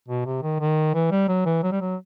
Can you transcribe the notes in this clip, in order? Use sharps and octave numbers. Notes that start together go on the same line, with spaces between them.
B2
C3
D#3
D#3
E3
G3
F#3
E3
F#3
G3
F#3